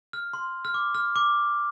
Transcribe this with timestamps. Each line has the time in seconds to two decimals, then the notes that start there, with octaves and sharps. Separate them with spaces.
0.13 F6
0.33 C6
0.65 F6
0.74 D6
0.95 F6
1.16 D6